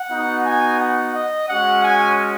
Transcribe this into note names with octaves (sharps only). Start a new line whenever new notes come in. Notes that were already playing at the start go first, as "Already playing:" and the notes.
Already playing: F#5
B3 D#4 F#4
G#5
F#5
D#5
G#3 C#4 F#4 F#5
G#5